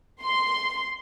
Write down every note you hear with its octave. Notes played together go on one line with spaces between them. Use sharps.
C6